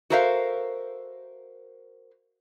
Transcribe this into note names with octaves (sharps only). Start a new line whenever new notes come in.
F#4 A4 A#4 C5 E5 F5